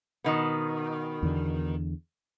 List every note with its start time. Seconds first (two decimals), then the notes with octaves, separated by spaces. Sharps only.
0.24 B2 D#3 B3
1.23 E2 D3